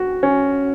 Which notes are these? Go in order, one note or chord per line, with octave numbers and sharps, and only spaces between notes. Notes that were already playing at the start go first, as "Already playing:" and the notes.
Already playing: F#4
C#4